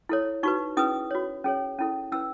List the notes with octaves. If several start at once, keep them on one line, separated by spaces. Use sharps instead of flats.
E4 A4 C#5
D#4 F#4 B4 C#6
C#4 E4 G#4 B4 D#6
F#4 C#5
C#4 G#4 C#5
C#4 E4 A4
C#4 E4 B4 E6